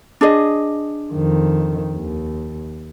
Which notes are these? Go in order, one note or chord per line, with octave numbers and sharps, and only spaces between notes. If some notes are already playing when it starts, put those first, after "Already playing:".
D4 G#4 D#5
F2 D#3
D#2